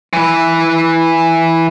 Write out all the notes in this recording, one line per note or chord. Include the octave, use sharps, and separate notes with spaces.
E3 B4